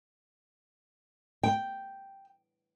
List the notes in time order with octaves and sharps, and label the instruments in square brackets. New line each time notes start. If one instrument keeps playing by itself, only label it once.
[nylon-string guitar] G5